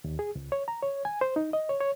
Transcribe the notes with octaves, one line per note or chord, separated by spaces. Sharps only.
D#2
G#4
C#2
C#5
A#5
C#5
G#5
C5
D#4
D#5
C#5
C#5